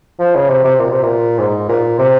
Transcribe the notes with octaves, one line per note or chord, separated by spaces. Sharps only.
F3
C#3
C3
C3
A#2
C3
A#2
G#2
A#2
C3